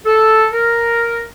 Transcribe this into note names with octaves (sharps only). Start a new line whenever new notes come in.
A4
A#4